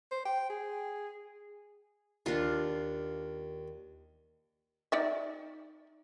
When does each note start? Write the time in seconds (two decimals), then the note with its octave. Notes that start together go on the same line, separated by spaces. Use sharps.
0.12 C5
0.25 G5
0.50 G#4
2.26 D#2 D4 F4
4.92 D#4 D5 E5